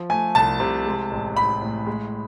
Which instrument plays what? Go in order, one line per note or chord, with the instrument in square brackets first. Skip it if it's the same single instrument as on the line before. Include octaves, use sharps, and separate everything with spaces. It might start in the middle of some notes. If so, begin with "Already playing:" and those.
Already playing: [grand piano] F3
[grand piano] A3 [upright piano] G#5
[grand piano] C2 [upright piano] A5
[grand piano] C3
G#3
A1
[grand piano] A1 [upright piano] B5
[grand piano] A2
G#3